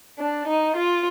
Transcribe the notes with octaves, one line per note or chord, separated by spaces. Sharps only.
D4
D#4
F4